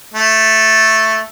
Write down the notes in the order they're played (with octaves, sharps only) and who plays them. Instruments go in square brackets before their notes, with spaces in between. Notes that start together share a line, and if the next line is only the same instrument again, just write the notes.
[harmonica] A3